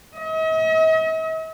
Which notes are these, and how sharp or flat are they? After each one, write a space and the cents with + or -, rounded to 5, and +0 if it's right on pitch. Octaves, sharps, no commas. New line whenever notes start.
D#5 +45